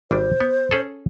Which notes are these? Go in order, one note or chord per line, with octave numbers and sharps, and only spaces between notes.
G#1 G3 D4 C5
B3
C#4 G#4 A4